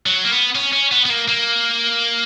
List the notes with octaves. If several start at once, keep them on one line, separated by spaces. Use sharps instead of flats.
F#3
A#3
B3
C#4
C#4
B3
B3
A#3
A#3